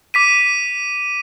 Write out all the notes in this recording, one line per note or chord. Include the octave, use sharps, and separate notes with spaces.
D6 B6 D#7